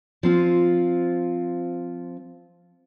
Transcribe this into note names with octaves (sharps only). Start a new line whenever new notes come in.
F3 C4 F4